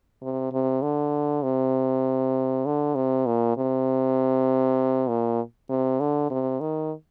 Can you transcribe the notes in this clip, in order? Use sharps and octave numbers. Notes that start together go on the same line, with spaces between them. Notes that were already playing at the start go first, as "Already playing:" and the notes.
C3
C3
D3
C3
D3
C3
A#2
C3
A#2
C3
D3
C3
D#3